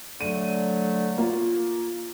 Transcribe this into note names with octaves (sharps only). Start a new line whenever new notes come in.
D3 F#3 A3 D#7
A#3 F4